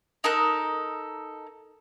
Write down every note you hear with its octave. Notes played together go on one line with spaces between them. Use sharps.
D#4 A4 A#4 F#6